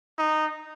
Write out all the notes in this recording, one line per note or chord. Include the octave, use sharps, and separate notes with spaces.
D#4